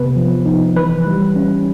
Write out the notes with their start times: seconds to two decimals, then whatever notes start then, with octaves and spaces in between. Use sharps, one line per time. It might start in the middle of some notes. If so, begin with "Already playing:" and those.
Already playing: C3 B3 B4
0.16 F3
0.46 D#4
0.76 E3 B4
1.07 G3
1.36 C#4